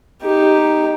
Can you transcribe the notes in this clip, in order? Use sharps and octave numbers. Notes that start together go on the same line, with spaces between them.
D#4 G4